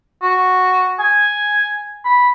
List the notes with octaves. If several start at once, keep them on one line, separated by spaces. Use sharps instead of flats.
F#4
G#5
B5